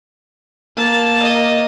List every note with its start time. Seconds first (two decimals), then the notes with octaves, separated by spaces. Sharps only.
0.77 A#3 A5
1.22 D#5